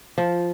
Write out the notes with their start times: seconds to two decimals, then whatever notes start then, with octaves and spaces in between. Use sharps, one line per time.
0.18 F3